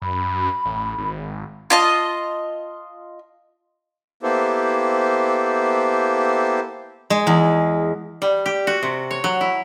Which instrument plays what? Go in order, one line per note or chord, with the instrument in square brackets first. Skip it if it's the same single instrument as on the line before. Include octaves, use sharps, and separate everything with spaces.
[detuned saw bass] F#2 [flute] B5
[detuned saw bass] A1
G#1
[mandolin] F4 D#5 A5
[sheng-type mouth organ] A#3 B3 E4 G4 A4 C5
[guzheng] G#3
E2
[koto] G3
G4
F#4
C3
C#5
F#3
E4